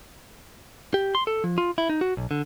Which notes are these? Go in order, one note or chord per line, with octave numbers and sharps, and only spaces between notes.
G4
C6
A4
F3
F4
E4
D#4
F#4
B1
D3